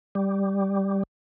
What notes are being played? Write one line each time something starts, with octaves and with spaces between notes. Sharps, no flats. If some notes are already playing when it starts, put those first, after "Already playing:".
G3